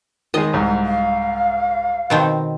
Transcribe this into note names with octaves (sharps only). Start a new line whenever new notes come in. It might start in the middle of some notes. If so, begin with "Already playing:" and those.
D#3 G#3 D#5
C2 G#2
F5
B2 D#3 C4